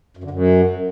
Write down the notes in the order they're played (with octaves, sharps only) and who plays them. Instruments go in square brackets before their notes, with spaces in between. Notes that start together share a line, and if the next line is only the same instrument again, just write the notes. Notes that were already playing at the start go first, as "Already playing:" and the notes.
[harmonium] F#2
D3
F#2